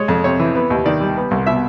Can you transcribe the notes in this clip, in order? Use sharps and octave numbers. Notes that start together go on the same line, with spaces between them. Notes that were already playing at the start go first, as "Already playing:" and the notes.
Already playing: G#3 C#5
F2
C3 C#5
E3
B3
D#2
D#3 D5
G3
B3
C2
B2 E5